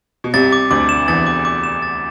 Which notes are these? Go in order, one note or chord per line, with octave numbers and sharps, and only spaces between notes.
B2
C2 C3 A6
D6
D2 D3 D6
E7
E2 E3 A6
D6
D6
E7
A6